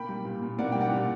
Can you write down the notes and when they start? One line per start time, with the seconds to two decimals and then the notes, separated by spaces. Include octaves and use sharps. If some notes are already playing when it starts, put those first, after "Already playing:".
Already playing: A#3 G5 B5
0.09 G3
0.25 A#2
0.42 A#2
0.59 A#3 D5 F#5
0.72 G3 G5
0.80 D5 F#5
0.91 A#2